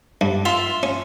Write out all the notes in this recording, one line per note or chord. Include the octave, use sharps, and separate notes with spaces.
G2
F4 E5 C6
C#4